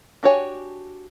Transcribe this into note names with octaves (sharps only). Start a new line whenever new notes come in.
D4 F#4 G4 C#5 G#5